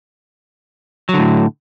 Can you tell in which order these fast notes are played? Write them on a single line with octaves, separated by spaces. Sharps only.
F#3 D3 A2